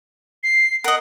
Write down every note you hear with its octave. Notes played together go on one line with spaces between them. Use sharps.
C7
A#4 D#5 F#5